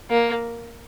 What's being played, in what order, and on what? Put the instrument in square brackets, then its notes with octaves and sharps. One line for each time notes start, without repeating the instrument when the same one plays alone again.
[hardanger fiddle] A#3